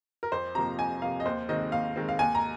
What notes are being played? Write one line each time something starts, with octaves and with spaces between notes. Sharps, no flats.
A#4
F2 C5
C3 F3 A#3 A#5
F2 G#5
C3 F3 A#3 F5
D#5
D#2 C5
D#3 G#3 C4 D#5
D#2 F5
D#3 G#3 C4
F5
D#2 G#5
A#5